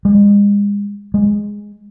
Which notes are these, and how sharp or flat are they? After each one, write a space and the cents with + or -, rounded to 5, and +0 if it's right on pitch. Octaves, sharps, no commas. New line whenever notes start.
G#3 -40
G#3 -5